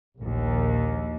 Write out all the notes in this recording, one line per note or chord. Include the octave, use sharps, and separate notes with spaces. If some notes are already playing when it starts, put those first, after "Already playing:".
A#1 D#2